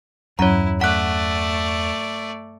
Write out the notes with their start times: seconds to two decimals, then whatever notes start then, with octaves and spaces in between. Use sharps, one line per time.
0.39 E2 G2 F#3 C#4 E4 C#5 A#5
0.81 A3 D5 F#5 F#6